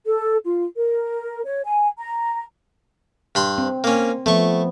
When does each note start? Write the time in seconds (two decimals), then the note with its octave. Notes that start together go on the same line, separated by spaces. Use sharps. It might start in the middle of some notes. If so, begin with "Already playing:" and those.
0.05 A4
0.44 F4
0.76 A#4
1.45 C#5
1.64 G#5
1.98 A#5
3.35 G2 B5 C6
3.58 C4
3.84 A#3 C#4
4.26 F3 A3 B3 C#6